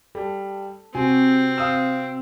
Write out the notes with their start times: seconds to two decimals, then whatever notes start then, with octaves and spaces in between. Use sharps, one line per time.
0.15 G3 A4
0.95 C3 C4 F#4 G#5
1.58 F5 D#6 E6